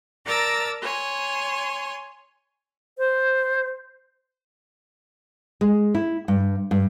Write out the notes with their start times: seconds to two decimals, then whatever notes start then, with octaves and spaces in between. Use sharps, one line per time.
0.24 A#4 D5 A5 A#5 E6 A6
0.82 C#5 G#5 C6
2.98 C5
5.61 G#3
5.95 E4
6.28 G2
6.71 G2